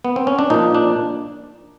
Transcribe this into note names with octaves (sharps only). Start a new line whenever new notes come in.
B3
C4
C#4
D4
A#2 F3 D#4
D4